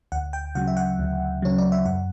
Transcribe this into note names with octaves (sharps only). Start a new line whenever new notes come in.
D2 F#5
G5
C#3 F#3 F#5
E5
F#5
D2
C#3 F#3 C#5
D5
E5
F#2 F#5